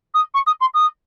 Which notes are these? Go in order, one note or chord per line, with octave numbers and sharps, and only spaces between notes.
D#6
C#6
D#6
C6
D#6